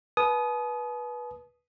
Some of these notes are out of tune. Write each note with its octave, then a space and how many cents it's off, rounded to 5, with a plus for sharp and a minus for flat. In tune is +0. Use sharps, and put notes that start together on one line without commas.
B4 -20 A5 -45 D#6 +0